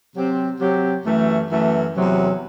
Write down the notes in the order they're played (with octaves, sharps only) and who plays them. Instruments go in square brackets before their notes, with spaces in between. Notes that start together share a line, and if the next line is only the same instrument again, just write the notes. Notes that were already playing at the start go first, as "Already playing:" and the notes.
[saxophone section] C3 F#3 C4 G4
C3 F#3 C4 G4
F#2 E3 A3
F#2 E3 A3
E2 C3 F#3